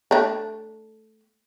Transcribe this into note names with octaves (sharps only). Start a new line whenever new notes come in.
A3 D4